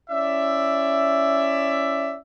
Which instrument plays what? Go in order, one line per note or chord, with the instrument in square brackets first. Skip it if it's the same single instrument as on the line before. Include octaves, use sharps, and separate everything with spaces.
[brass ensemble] C#4 E4 D5 E5